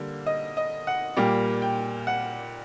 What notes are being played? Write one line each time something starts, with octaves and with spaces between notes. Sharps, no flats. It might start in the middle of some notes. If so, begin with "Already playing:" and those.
Already playing: D3 G3 A#3
D#5
D#5
F#5
A#2 G3 A#3 G5
G5
F#5